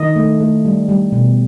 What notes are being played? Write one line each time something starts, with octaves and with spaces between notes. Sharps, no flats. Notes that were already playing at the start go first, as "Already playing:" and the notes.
Already playing: D#3 D#5
A3
A3
G3
G3
B2